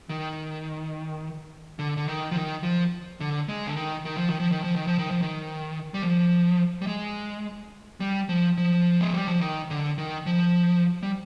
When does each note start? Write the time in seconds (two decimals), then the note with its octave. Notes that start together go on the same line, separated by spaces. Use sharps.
0.09 D#3
1.79 D3
1.97 D3
2.08 D#3
2.31 F3
2.36 D#3
2.63 F3
3.20 D3
3.48 G#3
3.67 D3
3.76 D#3
4.05 D#3
4.16 F3
4.29 D#3
4.40 F3
4.52 D#3
4.64 F3
4.76 D#3
4.87 F3
4.98 D#3
5.11 F3
5.22 D#3
5.94 G3
6.02 F3
6.82 G3
6.87 G#3
8.00 G3
8.29 F3
8.58 F3
9.01 G#3
9.14 G3
9.27 F3
9.41 D#3
9.70 D3
9.98 D#3
10.26 F3
11.03 G3